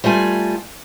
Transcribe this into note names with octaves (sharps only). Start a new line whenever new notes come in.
G3 A3 F4 G#5